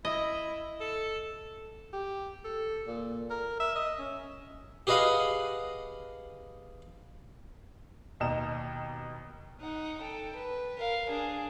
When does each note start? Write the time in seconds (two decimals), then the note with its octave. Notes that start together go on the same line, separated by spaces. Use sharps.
0.05 E4 D#5
0.80 A4
1.93 G4
2.44 A4
2.87 A#2
3.30 A#4
3.60 E5
3.76 D#5
3.99 C#4
4.87 G4 G#4 B4 D#5 F5 F#5
8.20 D#2 B2 D#5 A#5 E7
9.61 D#4 F#5
10.01 A4 G5
10.35 B4
10.78 A#4 F5
11.08 D4 G#4